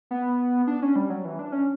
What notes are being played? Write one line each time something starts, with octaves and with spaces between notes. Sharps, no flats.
B3
D4
C#4
G3
F#3
E3
D4
C#4